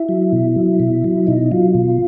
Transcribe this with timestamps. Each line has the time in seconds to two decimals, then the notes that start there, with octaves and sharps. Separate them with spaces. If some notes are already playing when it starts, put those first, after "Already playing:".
Already playing: E4
0.09 F#3
0.33 B2
0.56 F#3
0.80 B2
1.04 F#3
1.27 B2 D#4
1.51 F#3 F4
1.75 B2